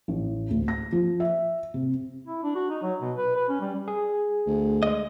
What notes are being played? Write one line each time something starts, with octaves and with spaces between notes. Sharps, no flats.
A1
D2
A#6
F3
E5
C3
E4
D4
F#4
D#4
F#3
B2
B4
B4
C#4
G3
G#4
D2
G#3 D#5